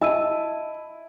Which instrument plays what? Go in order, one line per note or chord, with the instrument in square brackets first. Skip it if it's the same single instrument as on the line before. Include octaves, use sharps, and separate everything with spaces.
[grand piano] E4 [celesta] D#5 E6 D#7 [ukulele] A5